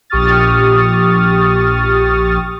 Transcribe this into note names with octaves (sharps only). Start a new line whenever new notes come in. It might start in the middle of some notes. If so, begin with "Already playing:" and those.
A#1 G4 C#6 D#6 F6 A6